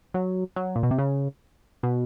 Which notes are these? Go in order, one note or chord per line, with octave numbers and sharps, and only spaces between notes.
F#3
F#3
A#2
B2
C3
C#3
B2